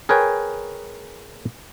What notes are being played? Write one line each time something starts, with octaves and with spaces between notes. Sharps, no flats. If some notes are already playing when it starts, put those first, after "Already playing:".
G#4 A#4 B4 C#5 G5 G#5